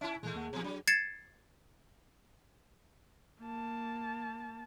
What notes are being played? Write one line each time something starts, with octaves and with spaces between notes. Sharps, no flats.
C#4 E4 E5 A5
A#2 E3 G#3 A3
D#2 A#3 F#5
A#2 F3 C4 G#4
F#3 D4
G#6 A6 C7 C#7 E7
A#3 A5